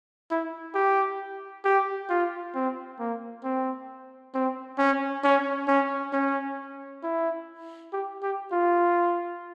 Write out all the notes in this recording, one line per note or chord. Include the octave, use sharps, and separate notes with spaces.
E4
G4
G4
F4
C4
A#3
C4
C4
C#4
C#4
C#4
C#4
E4
G4
G4
F4